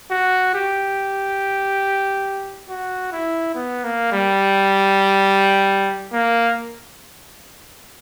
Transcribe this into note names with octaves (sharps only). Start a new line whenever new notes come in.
F#4
G4
F#4
E4
B3
A#3
G3
A#3